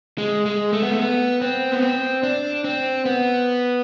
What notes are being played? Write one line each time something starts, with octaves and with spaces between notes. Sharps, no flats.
G#3
G#3
A3
B3
A3
B3
C4
B3
C4
D4
C4
B3